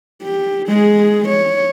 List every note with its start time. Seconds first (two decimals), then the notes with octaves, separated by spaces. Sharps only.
0.22 G4
0.68 G#3 G#4
1.29 C#5